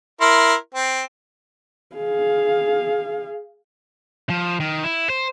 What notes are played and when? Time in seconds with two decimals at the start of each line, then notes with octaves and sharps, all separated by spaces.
0.21 E4 A#4 C6
0.74 C4
1.96 G#4 F5
4.30 F3
4.60 D#3
4.84 E4
5.10 C5